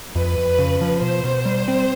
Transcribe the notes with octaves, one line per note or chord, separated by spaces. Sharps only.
F2 B4
F2
C#3
F3
B2 C5
B2
G3
C4